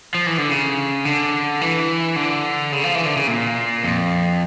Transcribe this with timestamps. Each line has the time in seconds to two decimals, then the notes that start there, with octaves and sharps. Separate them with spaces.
0.14 F3
0.27 E3
0.38 D3
0.50 C#3
1.05 D3
1.61 E3
2.16 D3
2.72 C#3
2.84 F3
2.95 E3
3.06 D3
3.16 C#3
3.27 A#2
3.83 F2